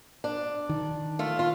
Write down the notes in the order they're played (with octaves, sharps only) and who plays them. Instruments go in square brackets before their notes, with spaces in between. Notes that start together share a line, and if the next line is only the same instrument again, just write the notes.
[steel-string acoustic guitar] D4
[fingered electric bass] D#3
[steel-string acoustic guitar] A3 F4
F4